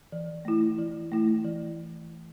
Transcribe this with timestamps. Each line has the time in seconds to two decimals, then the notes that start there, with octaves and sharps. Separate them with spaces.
0.12 E3
0.45 A3 E4
0.78 E3
1.12 A3 E4
1.45 E3